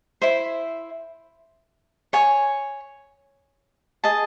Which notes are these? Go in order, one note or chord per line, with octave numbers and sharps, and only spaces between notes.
E4 C5 E5
C#5 G#5 C#6
G#4 D#5 A5